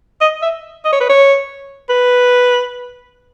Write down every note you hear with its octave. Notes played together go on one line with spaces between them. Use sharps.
D#5
E5
D#5
C#5
B4
C#5
B4